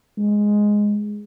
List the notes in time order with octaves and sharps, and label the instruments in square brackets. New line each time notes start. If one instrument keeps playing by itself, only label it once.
[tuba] G#3